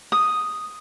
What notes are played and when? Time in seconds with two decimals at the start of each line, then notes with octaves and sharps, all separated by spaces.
0.12 D#6